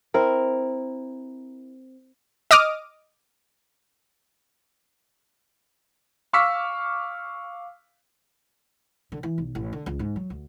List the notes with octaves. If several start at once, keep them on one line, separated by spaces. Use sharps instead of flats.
C4 E4 A#4
D#5 D6 D#6 F6
F5 C#6 D6 E6 F6 B6
D3
E3
B1
A1
D3
C#2
G#2
F#3
D2